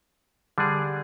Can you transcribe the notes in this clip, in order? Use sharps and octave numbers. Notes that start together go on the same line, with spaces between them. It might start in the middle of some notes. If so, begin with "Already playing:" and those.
D3 G3 D4 G#4